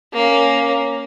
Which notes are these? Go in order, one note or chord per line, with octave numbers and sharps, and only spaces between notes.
A#3 C#4